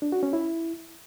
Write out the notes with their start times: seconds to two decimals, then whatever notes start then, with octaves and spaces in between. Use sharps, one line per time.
0.02 D4
0.12 F#4
0.23 C#4
0.33 E4